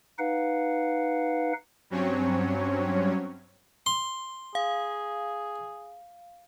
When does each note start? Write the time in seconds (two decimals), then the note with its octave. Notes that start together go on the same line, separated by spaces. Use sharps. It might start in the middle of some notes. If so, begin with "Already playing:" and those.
0.19 D#4 B4 F5 F#5
1.90 G2 F#3 C4 C#4 C#5
3.86 C6
4.55 G#4 F5